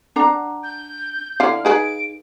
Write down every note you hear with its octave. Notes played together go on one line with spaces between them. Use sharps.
D4 F#5 A#5
G6
D3 E4 F5 F6
D#4 G#4 B4 D7